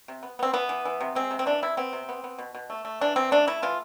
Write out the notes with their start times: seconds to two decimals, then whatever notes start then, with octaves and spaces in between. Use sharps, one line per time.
0.08 C3
0.23 B3
0.39 B3 C4
0.53 E3 B3
0.69 E3
0.85 E3
1.01 C3
1.15 G#3 C4
1.31 C3
1.39 C4
1.46 E3 D4
1.62 C3 E4
1.77 B3 C4
1.93 C3
2.09 B3
2.24 B3
2.38 B2
2.55 B2
2.70 A3
2.85 A3
3.01 E3 D4
3.16 E3 C4
3.31 A3 D4
3.47 A3 E4
3.62 E3 F4